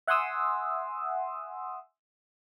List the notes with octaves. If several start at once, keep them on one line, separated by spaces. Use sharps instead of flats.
E5 F#5 G#5 C6 D#6 E6